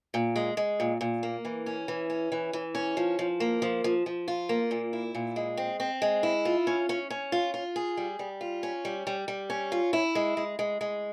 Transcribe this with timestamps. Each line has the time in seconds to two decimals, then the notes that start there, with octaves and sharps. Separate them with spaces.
0.14 A#2
0.36 G#3
0.57 G#3
0.80 A#2
1.01 A#2
1.23 A#3
1.45 E3
1.66 C#4
1.88 E3
2.10 C#4
2.32 E3
2.53 E3
2.75 C#4
2.97 F3
3.19 F3
3.40 A#3
3.62 F3
3.84 F3
4.06 F3
4.28 F4
4.49 A#3
4.71 A#2
4.93 E4
5.15 A#2
5.36 G#3
5.57 C4
5.80 C4
6.02 G#3
6.23 E4
6.45 F4
6.67 C#4
6.89 C#4
7.10 C#4
7.32 F4
7.54 F4
7.76 G#4
7.97 G3
8.19 G3
8.41 F4
8.63 C#4
8.85 G3
9.07 G3
9.28 G3
9.50 C#4
9.72 F4
9.93 E4
10.15 G#3
10.37 G#3
10.59 G#3
10.81 G#3